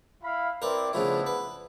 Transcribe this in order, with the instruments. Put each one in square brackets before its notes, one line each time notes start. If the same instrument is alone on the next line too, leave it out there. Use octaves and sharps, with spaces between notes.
[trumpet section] E4 F5 B5
[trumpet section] C4 E4 D5 [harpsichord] A#4 B4
[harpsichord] C#3 F3 A3 [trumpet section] B3 D4 E4
[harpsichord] B4